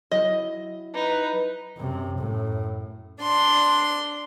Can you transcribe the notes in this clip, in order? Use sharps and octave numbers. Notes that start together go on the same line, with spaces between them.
F#3 E4 D#5
D#4 B4
F#2 C3
F#2 A2
D4 C6